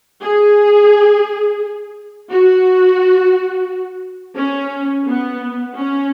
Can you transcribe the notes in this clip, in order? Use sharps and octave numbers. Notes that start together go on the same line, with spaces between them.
G#4
F#4
C#4
B3
C#4